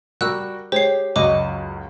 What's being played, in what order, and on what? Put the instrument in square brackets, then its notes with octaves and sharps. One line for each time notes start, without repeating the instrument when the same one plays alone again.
[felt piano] G3 F#4 A#4 [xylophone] E6 F#6
[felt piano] G#3 [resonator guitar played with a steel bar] G4 [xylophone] C5 C#5 C7
[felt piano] C#2 F#2 [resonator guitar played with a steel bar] F#4 D#5 [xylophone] D6